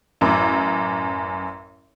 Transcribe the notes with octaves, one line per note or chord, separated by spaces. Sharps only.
A1 F#2 D6